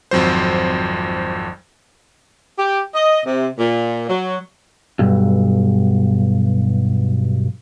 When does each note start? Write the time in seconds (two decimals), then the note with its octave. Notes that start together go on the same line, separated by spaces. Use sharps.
0.11 G#1 F2 F#3 C5
2.58 G4
2.94 D#5
3.25 C3
3.58 A#2
4.08 F#3
4.99 B1 G2